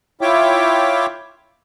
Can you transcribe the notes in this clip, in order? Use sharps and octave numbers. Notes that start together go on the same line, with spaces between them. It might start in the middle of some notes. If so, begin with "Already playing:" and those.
E4 F4 C#5 E5 G5 D6